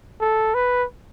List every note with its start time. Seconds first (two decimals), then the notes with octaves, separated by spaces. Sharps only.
0.21 A4
0.54 B4